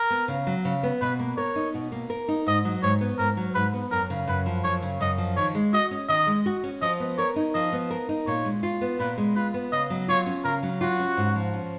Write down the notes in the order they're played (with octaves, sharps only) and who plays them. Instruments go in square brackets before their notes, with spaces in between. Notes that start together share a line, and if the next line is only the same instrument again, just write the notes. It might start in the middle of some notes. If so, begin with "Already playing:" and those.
Already playing: [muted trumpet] A#4
[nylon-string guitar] B3
C#3
F#3
C#3
B3
[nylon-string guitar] B2 [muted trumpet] B4
[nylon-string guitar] A#3
[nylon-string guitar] A#4 [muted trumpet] C#5
[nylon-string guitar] D#4
B2
A#3
A#4
D#4
[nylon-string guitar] G#2 [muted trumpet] D#5
[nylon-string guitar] F#3
[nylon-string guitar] G#2 [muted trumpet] C#5
[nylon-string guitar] B3
[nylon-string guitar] G#2 [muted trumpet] A#4
[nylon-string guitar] F#3
[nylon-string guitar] G#2 [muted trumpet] B4
[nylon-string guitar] B3
[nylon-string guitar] F#2 [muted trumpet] A#4
[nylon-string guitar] C#3
[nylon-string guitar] F#2 [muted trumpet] B4
[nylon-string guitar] F3
[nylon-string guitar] F#2 [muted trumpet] C#5
[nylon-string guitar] C#3
[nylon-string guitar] F#2 [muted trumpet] D#5
[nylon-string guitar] F3
[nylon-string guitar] D#3 [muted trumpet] C#5
[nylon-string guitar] G#3
[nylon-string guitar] F#4 [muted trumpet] D#5
[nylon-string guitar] C#4
[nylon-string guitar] D#3 [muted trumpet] D#5
[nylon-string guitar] G#3
F#4
C#4
[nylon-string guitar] F3 [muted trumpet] D#5
[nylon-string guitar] B3
[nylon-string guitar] A#4 [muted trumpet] C#5
[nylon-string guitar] D#4
[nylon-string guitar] F3 [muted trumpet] D#5
[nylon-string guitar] B3
A#4
D#4
[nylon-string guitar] A#2 [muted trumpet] C#5
[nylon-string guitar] G#3
F4
B3
[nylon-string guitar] A#2 [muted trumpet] B4
[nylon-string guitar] G#3
[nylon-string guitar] F4 [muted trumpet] B4
[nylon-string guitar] B3
[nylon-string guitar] C#3 [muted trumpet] D#5
[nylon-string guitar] F#3
[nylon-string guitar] F4 [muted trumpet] C#5
[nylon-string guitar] C#4
[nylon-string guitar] C#3 [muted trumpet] A#4
[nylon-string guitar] F#3
[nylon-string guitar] F4 [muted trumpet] F#4
[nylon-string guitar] C#4
G#2
F3
C#4